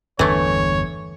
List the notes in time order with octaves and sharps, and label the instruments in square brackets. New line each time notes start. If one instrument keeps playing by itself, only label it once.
[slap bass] G1 E2 D4 [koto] E3 A3 [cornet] C#5